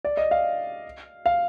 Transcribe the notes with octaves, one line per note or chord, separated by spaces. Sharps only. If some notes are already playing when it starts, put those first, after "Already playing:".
D5
D#5
F5
F5